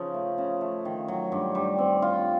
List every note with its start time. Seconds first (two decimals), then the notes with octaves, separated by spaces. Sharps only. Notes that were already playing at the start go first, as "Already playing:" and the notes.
Already playing: C#3 F3 D#4
0.14 A3
0.38 C#3
0.61 A3
0.85 D#3
1.08 F#3
1.32 G2
1.55 G3
1.78 C4
2.02 F4